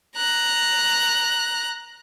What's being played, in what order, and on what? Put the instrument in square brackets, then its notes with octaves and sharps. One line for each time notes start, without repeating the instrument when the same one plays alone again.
[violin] A#5 F#6